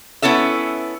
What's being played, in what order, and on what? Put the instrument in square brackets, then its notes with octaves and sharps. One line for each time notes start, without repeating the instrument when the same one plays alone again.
[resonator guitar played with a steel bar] B3 C#4 E4 A4 E5